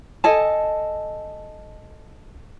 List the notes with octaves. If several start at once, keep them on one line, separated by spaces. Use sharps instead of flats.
A4 D#5 G#5 A5